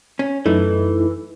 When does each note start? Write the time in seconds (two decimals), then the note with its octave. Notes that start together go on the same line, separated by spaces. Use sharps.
0.19 C#4
0.46 F#2 E3 A3 D#4 E4